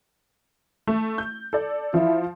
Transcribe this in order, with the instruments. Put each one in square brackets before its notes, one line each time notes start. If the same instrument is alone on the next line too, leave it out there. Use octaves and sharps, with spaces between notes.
[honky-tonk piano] A3
G6
A4 D5
[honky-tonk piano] F3 [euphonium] E4